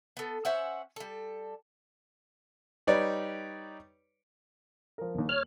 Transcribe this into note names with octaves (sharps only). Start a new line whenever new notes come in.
B3 A4
C#4 C5 E5 F#5
G3 A4
G3 D#4 B4 C#5 D5
F3 A#4
D#1 D#2
C#5 F6 F#7